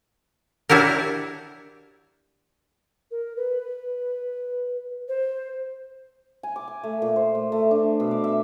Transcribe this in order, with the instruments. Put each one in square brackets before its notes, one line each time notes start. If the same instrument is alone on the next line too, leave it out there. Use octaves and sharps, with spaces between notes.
[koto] D4 E4 F#4 G4 A#4
[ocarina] A#4
B4
C5
[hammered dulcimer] G#5
D6
G#5
A3
A#2
C5
A3
A3
D4
B2
D6
E5